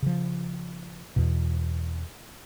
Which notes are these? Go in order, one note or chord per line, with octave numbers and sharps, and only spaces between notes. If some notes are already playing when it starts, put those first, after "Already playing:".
C#3 F3
E2 B2